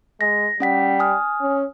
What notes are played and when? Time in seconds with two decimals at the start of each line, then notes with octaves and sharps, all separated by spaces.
0.21 G#3 A#6
0.60 G3 C#4 F#5 B6
0.99 G#5 D#6 F6
1.41 C#4